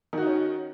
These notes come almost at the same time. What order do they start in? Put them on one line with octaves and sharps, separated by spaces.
D#3 F#4 D#4 C#4